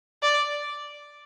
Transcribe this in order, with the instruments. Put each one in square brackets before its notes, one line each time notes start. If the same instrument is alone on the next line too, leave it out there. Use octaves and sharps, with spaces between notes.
[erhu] D5